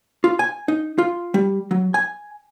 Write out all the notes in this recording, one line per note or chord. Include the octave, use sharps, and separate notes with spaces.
F4
G#5
D#4
F4
G3
F#3
G#5